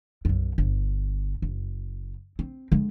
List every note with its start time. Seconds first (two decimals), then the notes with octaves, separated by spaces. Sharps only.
0.25 B1 F#2
0.58 G1
1.42 F#1
2.39 C4
2.72 D3 G#3